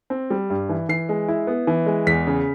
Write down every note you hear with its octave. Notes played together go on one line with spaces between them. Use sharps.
C4
G3
G2
E3
E3 C7
G#3
E4
B3
E3
G#3
E2 B6
C#3